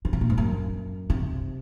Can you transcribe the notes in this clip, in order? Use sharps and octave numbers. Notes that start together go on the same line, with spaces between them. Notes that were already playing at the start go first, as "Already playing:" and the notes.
C#3
C3
A#2
G#2
F#2
C3